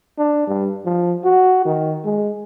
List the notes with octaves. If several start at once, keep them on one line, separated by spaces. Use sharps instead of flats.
D4
G2
F3
F#4
D#3
G#3